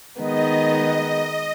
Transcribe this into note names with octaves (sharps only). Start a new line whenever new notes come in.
D#3 G#3 B3 D#4 D#5